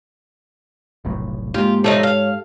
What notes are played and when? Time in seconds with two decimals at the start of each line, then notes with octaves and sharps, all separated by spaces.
1.05 F1 B1 A2
1.54 G#2 A#3 F4 G4
1.84 F3 A3 D#4 A4 C#5
2.03 F5